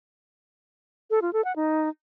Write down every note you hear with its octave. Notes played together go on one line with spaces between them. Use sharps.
A4
F4
A4
F#5
D#4